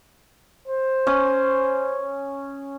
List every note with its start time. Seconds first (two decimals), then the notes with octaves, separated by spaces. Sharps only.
0.68 C5
1.07 C#4 D#6